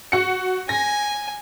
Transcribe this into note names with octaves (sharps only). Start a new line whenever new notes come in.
F#4 C#7
G#5 A#6